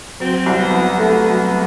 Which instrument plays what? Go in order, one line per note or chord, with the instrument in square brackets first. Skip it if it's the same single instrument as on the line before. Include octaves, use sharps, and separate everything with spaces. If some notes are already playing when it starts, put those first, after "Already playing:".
[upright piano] F#3 [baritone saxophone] C4
[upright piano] C2
[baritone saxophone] B3
[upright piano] F#3
A3
F#3